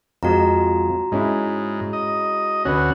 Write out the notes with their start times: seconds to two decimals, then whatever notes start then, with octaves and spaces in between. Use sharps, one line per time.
0.23 F2 F3 G#3 F#4 A#5
1.12 G#2 G#3 C#4 E4
1.93 D#5
2.65 D2 C#4 F#4 B4